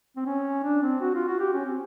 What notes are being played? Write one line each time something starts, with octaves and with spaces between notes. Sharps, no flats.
C4
C#4
D4
C4
F#4
F4
F#4
G4
C#4
C4